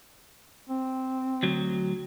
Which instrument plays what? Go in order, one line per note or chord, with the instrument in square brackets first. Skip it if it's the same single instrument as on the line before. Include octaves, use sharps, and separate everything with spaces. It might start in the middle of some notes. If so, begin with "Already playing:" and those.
[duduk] C4
[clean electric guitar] D2 F#3